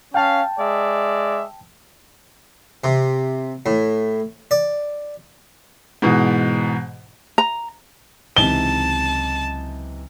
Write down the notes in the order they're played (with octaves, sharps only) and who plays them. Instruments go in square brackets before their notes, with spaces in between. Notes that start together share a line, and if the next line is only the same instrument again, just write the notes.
[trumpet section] C#4 F5 [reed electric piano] G5 A5
[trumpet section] G#3 D5 E5
[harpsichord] C3
A2
D5
[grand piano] G#2 B2 E3
[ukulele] A#5
[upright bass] C#2 F#3 [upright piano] C3 E3 D#4 [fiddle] A5 [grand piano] G7